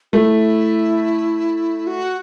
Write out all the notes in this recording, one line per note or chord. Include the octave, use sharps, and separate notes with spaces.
A3 E4 F#4
F#4